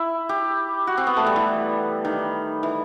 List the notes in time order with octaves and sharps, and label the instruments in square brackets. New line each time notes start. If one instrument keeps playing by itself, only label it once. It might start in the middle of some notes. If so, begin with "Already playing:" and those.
Already playing: [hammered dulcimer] E4
G4
F#4
C4
B3
A3
G3
E3
D#3
E3